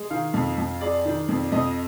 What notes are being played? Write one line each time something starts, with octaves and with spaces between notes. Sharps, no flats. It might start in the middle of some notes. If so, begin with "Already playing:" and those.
Already playing: G#3
D#3 F5
F2
F2
G#3 D5
D#3
F2
F2 D#5